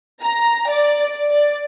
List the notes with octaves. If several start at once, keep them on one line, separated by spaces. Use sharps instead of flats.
A#5
D5
D5